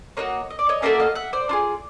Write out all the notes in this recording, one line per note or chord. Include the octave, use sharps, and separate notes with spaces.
A#3 D#4 F#4 C#5 D#5
D#5
D5
C#5 D#5
A#3 C#4 F#4 A4 D5 E5
D#5 F5
E5 F#5
C5 D5
D4 F4 G#4